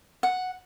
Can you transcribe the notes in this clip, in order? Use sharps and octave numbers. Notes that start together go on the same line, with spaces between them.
F#5